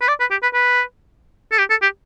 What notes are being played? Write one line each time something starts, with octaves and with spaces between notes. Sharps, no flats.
B4
D5
B4
G4
B4
B4
A4
G4
A4
G4